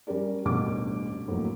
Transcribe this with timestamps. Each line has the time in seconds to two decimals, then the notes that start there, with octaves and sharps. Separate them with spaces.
0.07 G3 C#4 G4 A#4 D5
0.45 D#1 A1 D2 B2 D6
1.27 F2 A2 F#3 A#3